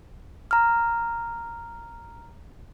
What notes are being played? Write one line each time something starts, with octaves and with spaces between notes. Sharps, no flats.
A#5 F6